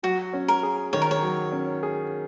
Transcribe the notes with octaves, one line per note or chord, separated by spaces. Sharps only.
F#3 F#4
C#4
A#4
G#4
D#3 C#5
A#4
C#5
F#3
C#4
G#4